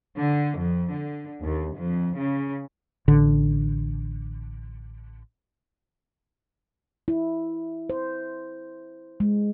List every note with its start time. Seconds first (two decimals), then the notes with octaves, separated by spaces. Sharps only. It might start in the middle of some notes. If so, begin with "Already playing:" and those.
0.19 D3
0.57 F2
0.92 D3
1.42 D#2
1.75 F2
2.15 C#3
3.08 A1 D3
7.08 E4
7.90 C5
9.20 G#3